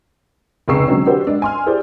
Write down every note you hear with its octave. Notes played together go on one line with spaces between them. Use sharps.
F1 C#2 G#4 C#6 E6 C7
D3 F#3 G#3 C4 C#4
D4 F#4 G4 B4 C5
G#3 D4
G#5 C6 F6
E4 G4 G#4 C5 D5